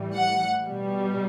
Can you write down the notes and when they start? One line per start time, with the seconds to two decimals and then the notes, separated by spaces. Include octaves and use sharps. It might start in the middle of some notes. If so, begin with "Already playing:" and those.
Already playing: A2 E3 G3
0.14 F#5
0.66 B2 G3